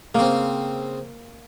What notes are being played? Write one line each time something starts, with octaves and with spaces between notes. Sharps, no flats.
C#3 A#3 C4